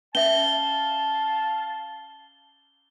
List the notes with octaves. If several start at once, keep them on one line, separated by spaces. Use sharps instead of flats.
C#4 E5 F5 A5 G7